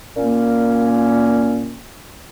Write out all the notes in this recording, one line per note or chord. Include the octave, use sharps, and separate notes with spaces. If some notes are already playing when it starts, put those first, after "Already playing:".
A#2 A#3 C#4